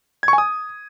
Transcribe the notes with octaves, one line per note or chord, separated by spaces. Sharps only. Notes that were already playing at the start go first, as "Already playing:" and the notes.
G#6
C#6
G#5
D#6